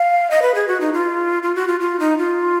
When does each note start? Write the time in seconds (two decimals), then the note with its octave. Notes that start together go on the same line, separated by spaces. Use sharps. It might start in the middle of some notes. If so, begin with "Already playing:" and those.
Already playing: F5
0.31 D#5
0.42 B4
0.55 G#4
0.68 F#4
0.81 D#4
0.93 F4
1.43 F4
1.55 F#4
1.68 F4
1.80 F4
2.00 D#4
2.18 F4